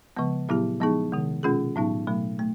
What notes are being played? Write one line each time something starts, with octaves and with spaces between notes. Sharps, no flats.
C#3 F3 G#3 B3
A#2 F#3 B3 E4 G4
F3 G#3 B3 D#4 G#4
C3 D#3 G#3
B2 G#3 C#4 F4 G#4
A2 F#3 B3 D#4
B2 F#3 A3
A3